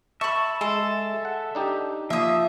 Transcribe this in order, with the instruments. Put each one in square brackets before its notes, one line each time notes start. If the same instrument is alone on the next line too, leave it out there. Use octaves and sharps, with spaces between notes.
[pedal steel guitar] E5 [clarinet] A5 [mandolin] B5 C#6
[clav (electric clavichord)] G#3 [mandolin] A4
[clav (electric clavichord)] F#5
D4 D#4 G4
[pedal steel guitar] F3 [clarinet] A#3 [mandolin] E5 D#6